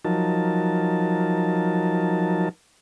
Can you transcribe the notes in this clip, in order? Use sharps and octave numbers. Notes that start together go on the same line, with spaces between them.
F3 F#3 D#4 A#4 A5